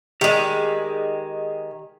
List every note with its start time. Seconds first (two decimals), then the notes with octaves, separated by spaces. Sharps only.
0.21 D#3 G#3 G4 G#4 D5